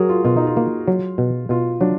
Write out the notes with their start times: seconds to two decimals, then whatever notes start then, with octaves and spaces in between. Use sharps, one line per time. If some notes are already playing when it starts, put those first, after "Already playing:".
Already playing: F#3 F#4 G#4 A#4
0.09 F4
0.25 B2 F4
0.36 D#4
0.47 F4
0.57 A#3
0.88 F#3
1.18 B2
1.49 B2 F4
1.81 F#3 D4